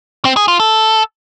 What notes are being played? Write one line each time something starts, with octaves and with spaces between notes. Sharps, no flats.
C4
G#4
F4
A4